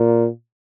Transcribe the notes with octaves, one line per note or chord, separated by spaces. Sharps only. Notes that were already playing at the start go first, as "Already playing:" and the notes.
Already playing: A#2